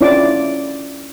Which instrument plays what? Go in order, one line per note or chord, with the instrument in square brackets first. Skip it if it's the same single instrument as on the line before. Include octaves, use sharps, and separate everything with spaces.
[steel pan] C#4 D4 E4 F4 D5 D6